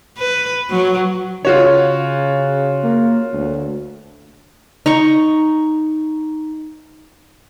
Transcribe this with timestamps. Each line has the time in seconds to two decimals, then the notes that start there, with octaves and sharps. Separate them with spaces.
0.18 B4
0.70 F#3
1.45 C#3 F4 F#4 C#5
2.84 A#3
3.33 D2
4.86 D#4 A#5 C#6